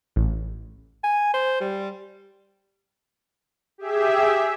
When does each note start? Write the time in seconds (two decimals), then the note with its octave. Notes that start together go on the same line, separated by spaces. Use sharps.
0.16 A1
1.04 G#5
1.34 C5
1.61 G3
3.78 G4 G#4 E5